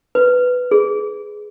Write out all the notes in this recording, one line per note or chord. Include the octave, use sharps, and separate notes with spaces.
B4
G#4